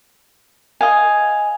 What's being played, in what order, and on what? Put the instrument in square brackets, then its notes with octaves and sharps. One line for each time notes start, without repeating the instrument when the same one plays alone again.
[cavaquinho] D#5 F5 G#5